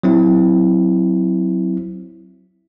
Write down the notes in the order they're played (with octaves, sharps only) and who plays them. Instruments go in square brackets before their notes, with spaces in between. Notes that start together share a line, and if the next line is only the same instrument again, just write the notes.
[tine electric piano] F#3 C4 E4